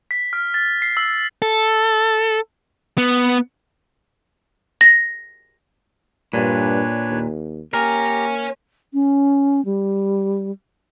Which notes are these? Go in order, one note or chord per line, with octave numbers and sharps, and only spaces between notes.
B6
F6
A6
C7
E6
A4
B3
A#6
G2 A#2 D4 B4 C#5
D#2
A#3 G4 A#4 C#5 G#5 A#5
C#4
G3